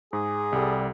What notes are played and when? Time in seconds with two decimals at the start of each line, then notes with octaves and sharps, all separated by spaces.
0.13 G#2 G#4
0.52 C2 G3 A4